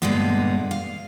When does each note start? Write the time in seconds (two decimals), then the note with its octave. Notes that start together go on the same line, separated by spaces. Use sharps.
0.02 G2 A#2 D3 G#3 A3 B3
0.71 F5